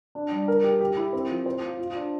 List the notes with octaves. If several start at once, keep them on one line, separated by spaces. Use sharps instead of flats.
D4
G3
A#4
G4
G4
E4
C4
F3
C5
F4
F4
D4